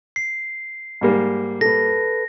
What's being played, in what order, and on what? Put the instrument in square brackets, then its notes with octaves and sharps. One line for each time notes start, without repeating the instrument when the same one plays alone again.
[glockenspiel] C7
[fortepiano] G#2 G3 A#3
[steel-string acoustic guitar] A4 B4 [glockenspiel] A#6